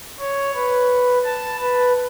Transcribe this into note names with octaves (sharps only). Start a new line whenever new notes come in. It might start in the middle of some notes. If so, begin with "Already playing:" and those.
C#5
B4
A5
B4